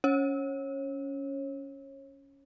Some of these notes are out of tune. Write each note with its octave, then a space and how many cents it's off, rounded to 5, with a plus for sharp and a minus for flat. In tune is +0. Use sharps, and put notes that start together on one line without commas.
C#4 +10 C#5 -30